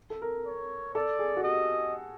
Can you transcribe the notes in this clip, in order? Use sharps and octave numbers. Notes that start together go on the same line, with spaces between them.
A4
A#4
C#5
A4 D5
G#4
F#4
G4 D#5